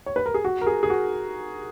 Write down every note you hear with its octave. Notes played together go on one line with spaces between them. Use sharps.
C#5
B4
A#4
G#4
F#4
A#4
G#4
G#4
F#4